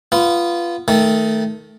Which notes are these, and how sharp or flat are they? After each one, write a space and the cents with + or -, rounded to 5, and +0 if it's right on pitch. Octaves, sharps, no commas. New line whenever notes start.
B3 +0 F4 -20
D#3 +15 A3 +0